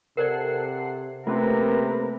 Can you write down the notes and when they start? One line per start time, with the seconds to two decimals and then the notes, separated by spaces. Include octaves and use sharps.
0.17 C3 A4 A#4 C5 D5 F#5 C7
1.27 C3 A3 A#3 C4 C#4 F4 A#4 B4